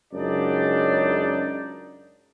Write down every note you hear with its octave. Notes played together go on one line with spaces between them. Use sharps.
C#2 F#2 C#3 D4 D#4 D5